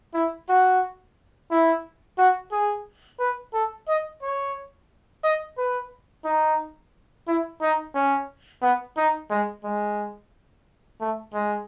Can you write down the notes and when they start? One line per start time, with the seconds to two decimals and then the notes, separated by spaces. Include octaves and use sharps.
0.14 E4
0.49 F#4
1.51 E4
2.18 F#4
2.52 G#4
3.19 B4
3.54 A4
3.88 D#5
4.22 C#5
5.24 D#5
5.58 B4
6.24 D#4
7.27 E4
7.61 D#4
7.95 C#4
8.62 B3
8.97 D#4
9.30 G#3
9.64 G#3
11.00 A3
11.34 G#3